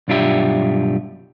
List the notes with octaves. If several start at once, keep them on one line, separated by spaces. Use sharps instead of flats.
B1 G2 D4 F4 G4 E5